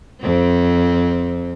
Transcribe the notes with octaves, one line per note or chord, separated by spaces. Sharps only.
F2 C4